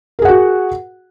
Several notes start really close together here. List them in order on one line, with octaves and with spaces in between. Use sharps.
A#4 G#4 F#5 F#4